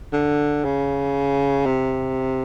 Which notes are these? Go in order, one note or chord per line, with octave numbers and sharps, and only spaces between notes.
D3
C#3
C3